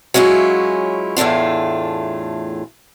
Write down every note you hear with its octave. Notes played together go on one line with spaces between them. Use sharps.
F#3 G#3 C#4 E4 F4
E2 A2 A3 D4 F4